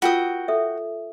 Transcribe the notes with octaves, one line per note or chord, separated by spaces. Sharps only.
F4 F#4 A#4 G5 D#6
A4 E5